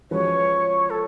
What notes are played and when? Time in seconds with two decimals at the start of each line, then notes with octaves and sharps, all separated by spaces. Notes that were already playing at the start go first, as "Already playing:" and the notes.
0.11 F3 G#3 C#4 F#4 B4 C#5
0.90 A4